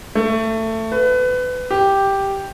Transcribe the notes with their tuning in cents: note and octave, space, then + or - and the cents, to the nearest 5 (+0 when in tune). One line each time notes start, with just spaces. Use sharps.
A3 +20
B4 +25
G4 +0